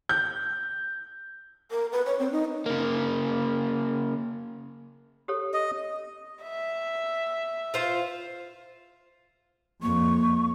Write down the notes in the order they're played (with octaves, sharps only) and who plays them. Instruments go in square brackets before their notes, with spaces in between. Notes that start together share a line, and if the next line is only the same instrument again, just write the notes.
[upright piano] G6
[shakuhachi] A#4
B4
C#5
C4
D#4
[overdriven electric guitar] C#3 A#3
[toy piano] G4 A4 C#5
[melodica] D#5
[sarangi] E5
[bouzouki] F4 C5 F5
[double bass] F2 [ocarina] A#3 [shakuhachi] C#6